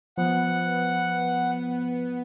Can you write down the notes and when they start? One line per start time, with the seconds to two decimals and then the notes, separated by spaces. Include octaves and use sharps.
0.18 F3 B3 F#5